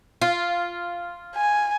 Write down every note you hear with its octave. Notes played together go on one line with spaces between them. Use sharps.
F4
G#5